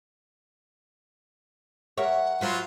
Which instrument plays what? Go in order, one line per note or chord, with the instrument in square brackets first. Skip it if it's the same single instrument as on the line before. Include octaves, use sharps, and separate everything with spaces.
[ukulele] A#4 E5 [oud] C#5 [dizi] F#5
[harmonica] F#3 F4 [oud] F#4 B4 C5